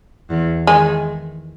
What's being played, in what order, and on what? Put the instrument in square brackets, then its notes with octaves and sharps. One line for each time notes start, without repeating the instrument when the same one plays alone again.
[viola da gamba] E2 E3
[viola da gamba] D#3 [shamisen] G#3